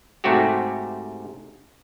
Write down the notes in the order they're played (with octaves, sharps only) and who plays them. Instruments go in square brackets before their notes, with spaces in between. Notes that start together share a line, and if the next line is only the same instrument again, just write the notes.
[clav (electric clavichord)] G#2 C3 A3 C4 F#4 G4